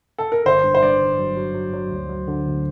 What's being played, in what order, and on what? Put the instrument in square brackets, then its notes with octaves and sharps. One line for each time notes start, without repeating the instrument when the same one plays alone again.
[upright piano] A4
A#4
[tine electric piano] G1 [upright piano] C5
[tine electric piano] G2
[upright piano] C5
[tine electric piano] G2 [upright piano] D5
[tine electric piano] G1
F#3
F#3
F#3
F#3
D2
F#3
D3
D2